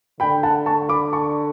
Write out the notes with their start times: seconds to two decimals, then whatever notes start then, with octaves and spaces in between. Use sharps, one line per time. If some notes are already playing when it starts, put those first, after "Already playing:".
0.20 D3 G5 B5
0.43 F#5 A5
0.66 A5 C#6
0.89 B5 D6
1.13 A5 C#6